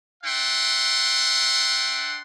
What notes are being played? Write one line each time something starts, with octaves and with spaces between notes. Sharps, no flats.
D4 E5 F#5 G5 C6